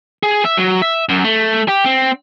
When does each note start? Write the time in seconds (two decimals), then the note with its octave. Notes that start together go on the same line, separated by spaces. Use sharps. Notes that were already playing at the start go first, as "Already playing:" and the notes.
0.23 G#4
0.45 E5
0.57 F#3
0.82 E5
1.09 F#2
1.25 A3
1.68 G4
1.85 C4